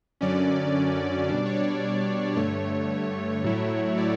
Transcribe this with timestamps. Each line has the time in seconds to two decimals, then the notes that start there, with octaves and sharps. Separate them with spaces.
0.21 F#2 D3 F#3 C#4 D5
1.29 B2 G3 D4 D5
1.46 C#5
1.56 D5
2.36 G2 D3 A3 C#5
3.44 A2 F#3 A3 E4
3.98 D5